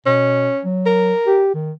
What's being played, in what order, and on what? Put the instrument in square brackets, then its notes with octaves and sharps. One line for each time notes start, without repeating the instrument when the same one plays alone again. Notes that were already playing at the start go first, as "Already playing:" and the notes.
[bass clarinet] B2 [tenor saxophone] C#4
[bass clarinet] F#3
[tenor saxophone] A#4
[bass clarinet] G4
D#3